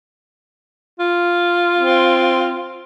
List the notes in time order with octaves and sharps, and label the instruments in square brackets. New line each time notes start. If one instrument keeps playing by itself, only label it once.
[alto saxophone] F4
[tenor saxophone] C4